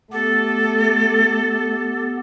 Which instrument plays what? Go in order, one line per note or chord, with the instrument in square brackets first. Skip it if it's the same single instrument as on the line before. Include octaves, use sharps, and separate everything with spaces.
[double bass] A3 [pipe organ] B3 G4 [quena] A4